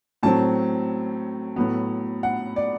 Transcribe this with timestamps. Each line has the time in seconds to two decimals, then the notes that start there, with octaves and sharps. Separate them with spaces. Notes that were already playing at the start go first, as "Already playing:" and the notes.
0.23 A2 F#3 C4 A5
1.56 A2 F#3 B3
2.23 F#5
2.56 D5